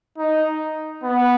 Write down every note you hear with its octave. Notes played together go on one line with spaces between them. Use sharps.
D#4
B3